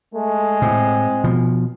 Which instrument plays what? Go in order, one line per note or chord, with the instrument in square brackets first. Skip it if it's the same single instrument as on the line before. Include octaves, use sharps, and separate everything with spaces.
[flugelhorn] G#3 [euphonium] A3
[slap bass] A2 [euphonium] C4
[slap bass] B2 F3